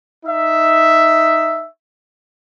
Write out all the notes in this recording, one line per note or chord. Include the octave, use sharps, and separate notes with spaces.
D#4 E5